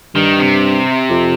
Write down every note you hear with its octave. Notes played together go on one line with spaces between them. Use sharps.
G2 D#3
C3
F2